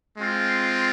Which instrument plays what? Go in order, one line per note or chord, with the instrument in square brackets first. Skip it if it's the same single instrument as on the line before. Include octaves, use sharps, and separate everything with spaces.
[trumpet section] G#3 C4 F4